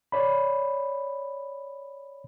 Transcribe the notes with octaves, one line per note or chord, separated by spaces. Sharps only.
C#5 D5 B5